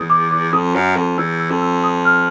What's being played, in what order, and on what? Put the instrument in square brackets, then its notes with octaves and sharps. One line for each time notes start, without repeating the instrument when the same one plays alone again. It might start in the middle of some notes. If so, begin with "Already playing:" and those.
Already playing: [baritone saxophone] E2 [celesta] D#6
[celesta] D6
D6
[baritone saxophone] F2 [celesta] D#6
[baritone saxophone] F#2
F2
[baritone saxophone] E2 [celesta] E6
[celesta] E6
[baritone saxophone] F2
[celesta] E6
D#6
F6